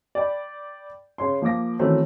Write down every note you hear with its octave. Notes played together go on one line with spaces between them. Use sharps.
D5 G5 B5
C#3 C#5 C6
F3 A#3 F5 D6 A#6
D#3 E3 F#3 A3 C4 C#4